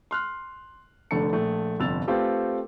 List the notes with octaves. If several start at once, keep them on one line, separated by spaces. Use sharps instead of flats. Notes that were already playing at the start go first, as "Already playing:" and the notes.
C6 F6 F#6
F1 D3 A3 A5 C#7
A#1 A3
G1 F2 C3 E6 A6 F7
A3 C4 F4 G4 A4 B4